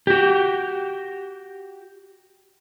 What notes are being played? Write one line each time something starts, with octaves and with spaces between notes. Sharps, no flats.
F#4 G4